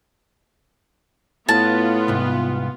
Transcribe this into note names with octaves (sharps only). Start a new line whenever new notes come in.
A2 B3 F4 A5
C2 G#2